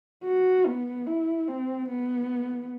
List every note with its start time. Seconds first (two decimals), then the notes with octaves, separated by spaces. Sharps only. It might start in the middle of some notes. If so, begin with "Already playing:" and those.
0.24 F#4
0.66 B3
1.06 E4
1.48 C4
1.89 B3